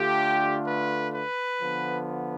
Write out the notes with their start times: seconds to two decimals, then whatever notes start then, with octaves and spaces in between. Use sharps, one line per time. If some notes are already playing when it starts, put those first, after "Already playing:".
Already playing: D3 A3 D4 F4 G4
0.66 B4
1.14 B4
1.61 D3 F3 B3